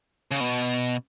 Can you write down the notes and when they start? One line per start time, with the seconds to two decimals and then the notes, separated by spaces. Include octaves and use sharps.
0.31 C#3
0.40 B2